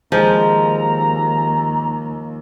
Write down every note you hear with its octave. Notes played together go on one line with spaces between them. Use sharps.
D#2 F3 G#3 A#5